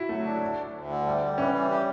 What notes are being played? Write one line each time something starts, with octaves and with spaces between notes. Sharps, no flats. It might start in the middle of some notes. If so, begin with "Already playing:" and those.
Already playing: E4 F#4
F#3 A3
D4
D2
D2
D2
D3
G3
G3
E3 C#4
G3
G4